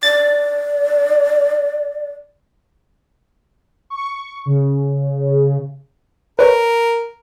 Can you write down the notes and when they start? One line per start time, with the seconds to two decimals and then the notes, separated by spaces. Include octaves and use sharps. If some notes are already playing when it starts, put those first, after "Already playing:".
0.03 D5 A6
3.90 C#6
4.46 C#3
6.39 A#4 B4 C#5